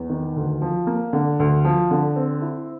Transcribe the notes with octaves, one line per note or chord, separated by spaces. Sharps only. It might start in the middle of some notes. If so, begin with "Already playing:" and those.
Already playing: E2
D#3
D2
F3
A#3
D3
D2
F3
D3
C4
E4